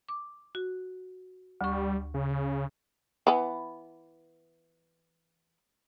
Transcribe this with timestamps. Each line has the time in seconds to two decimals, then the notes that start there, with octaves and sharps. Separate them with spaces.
0.09 D6
0.55 F#4
1.61 D2 G3 C#6
2.14 C#3
3.27 E3 B3